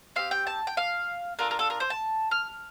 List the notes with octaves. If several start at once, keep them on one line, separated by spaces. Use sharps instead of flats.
C4 G4 F5
G5
A5
G5
F5
D4 F4 A4 A#4
A#4
A4
A#4
C5
A5
F6